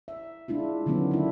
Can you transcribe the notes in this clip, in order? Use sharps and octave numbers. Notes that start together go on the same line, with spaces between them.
E5
G#3 D4 E4 F4
D3 D#3 F#3 B3 C#4
D4 E4